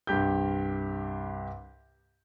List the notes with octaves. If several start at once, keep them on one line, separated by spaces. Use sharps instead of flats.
C2 G2 G4 G6